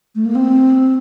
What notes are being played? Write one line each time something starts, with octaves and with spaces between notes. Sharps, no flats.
A3
A#3
C4